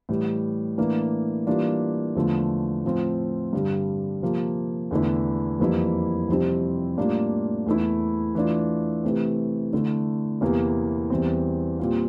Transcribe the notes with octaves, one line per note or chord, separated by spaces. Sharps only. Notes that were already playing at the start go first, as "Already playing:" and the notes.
A2 E3 G3
A2 E3 A#3 D4
E3 G3 A#3 D4 F4
E2 D3 F3 A3
A2 F3 C4 F4
G2 D3 G3
C3 F3 A#3
E2 D3 A3 E4
F2 E3 G3 A#3 E4
F2 C3 G3 C4 E4
A2 G3 A#3 D4 F4
E2 E3 A3 E4
E3 A3 D4 F4
C3 E3 A3 C4
D3 A3 E4
E2 C3 E3 A#3 E4
E2 E3 G3 C4
A#2 G3 C4 F4